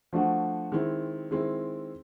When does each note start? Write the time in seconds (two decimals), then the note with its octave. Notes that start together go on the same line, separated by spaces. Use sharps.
0.13 F3 A3 D4 F#4
0.72 D#3 G#3 C4 E4
1.31 D#3 G#3 C4 E4